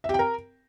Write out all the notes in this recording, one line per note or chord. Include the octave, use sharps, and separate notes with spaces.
E5
G4
G5
A#4